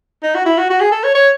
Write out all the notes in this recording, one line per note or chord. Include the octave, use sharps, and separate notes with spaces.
D#4
F#4
E4
F#4
F#4
G#4
A4
C#5
C#5